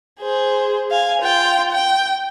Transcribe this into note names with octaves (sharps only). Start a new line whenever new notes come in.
G#4 C5
F5 G#5
F4 G5
G5